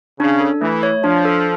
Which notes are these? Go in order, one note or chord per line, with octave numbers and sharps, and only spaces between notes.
C#3 D4
A4
E3 A3
C#5
F3 D4
A4